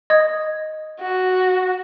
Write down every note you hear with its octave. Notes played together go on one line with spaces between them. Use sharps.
D#5 D#6 G#6
F#4